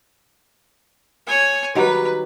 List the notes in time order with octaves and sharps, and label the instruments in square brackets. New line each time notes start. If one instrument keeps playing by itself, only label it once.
[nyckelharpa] C#5 G#5
[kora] D#3 F#3 G3 [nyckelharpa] B4